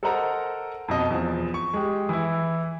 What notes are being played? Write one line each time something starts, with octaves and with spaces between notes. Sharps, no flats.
A4 A#4 C5 D#5 F#5 A#5
F2 B2 D#5
E2 F3
C#6
G#3 G4
E3 E4